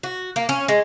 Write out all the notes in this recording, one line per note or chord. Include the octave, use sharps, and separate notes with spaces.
F#4
A#3
C#4
G#3